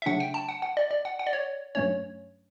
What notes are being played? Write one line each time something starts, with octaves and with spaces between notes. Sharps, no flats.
E5
C#3 F#3 A3 D4 F#5
G5
A5
F#5
F#5
D5
D5
F#5
F#5
D5
C#5
G2 F#3 A3 C#4 C#5